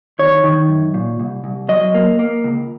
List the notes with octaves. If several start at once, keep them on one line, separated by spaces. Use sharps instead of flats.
D#3 C#5
D#3
F#2
A#2
C2
C2
F#3 D#5
A#3
A#3
C#2